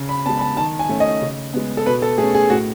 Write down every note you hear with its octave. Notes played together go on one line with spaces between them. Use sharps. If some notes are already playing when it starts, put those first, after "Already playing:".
Already playing: C#3
B5
G#3 B3 A5
B5
A5
D#3 A5
G#5
A3 C#4
D#5
C#3
G#3 B3
A4
B2 B4
A4
A3 C#4 G#4
G#4
A2 F#4